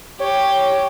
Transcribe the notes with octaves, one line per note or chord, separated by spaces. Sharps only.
G4 C#5